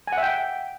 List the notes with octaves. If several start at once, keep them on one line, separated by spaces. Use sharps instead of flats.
G#5
F#5
E5
G5